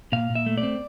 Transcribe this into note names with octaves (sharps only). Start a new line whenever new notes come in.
A#2 F5
A#2
E5
A3
D5
C4